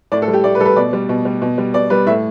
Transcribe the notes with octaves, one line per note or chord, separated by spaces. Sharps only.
A2 D5
A4
G3
G4
A2 D5
B4
G3 A4
B4
B2 D5
G3
B2
G3
B2
G3
B2 D5
G3 B4
A2 E5